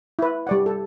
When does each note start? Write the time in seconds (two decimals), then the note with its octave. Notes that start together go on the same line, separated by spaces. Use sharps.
0.19 E4 B4
0.47 G3 D5 F#5
0.66 A4